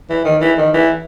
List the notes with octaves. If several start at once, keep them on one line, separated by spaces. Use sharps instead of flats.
E3
D#3
E3
D#3
E3